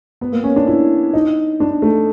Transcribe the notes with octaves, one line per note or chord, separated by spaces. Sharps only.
B3
A#3
C#4
D4
E4
D#4
D4
A3